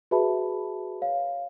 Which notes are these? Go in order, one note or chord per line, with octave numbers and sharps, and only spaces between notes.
F#4 G#4 B4 E5 A5 B5
C#5 F5